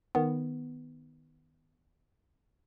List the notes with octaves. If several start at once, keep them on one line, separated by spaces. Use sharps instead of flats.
D#3 B3